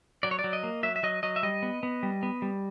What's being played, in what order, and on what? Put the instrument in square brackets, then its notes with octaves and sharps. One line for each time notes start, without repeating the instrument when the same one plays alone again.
[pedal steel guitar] F#3 D5
C#5
D5
F#3
D#5
A#3
F#3 E5
E5
F#3 D#5
F#3 D#5
E5
G3 D#5
B3
B3
G3
B3
G3